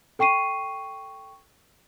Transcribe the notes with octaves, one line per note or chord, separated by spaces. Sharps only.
A4 G5 C#6 C7 D#7